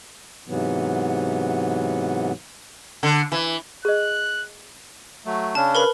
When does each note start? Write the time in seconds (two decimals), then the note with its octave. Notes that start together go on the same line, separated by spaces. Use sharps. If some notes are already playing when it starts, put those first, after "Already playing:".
0.48 G#2 C3 E3 F#3 B3
3.03 D3
3.32 E3
3.85 G#4 D#5 F#6
5.26 F#3 A3
5.55 C#3 C#4 D4 A5
5.75 A#4 B4 B5